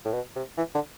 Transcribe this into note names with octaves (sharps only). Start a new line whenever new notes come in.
A2
B2
C3
E3
D3